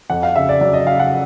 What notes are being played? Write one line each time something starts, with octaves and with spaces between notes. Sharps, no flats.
F2 F#5
F5
C#3 E5
D5
F#3 D5
D#5
C#3 F5
F#5